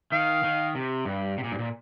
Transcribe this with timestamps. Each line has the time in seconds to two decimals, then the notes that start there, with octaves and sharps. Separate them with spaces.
0.12 D#3 F5
0.44 D#3
0.75 C3
1.05 G2
1.38 C3
1.44 A#2
1.52 G2
1.59 A#2